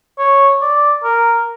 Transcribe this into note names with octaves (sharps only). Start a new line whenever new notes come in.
C#5
D5
A#4